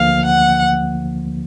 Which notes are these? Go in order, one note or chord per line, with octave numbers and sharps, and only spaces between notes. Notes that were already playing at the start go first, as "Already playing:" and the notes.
Already playing: D2 D3 F3 A#3 F5
F#5